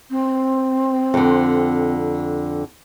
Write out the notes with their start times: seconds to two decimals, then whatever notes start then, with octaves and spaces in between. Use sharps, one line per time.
0.10 C4
1.14 F2 D3